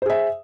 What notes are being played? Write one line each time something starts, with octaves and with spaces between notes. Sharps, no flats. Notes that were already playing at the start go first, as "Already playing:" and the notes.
G#4 C5 E5